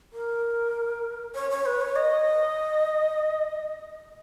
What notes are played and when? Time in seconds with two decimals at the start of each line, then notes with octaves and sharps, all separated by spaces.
0.12 A#4
1.35 C#5
1.50 C#5
1.66 B4
1.81 C#5
1.96 D#5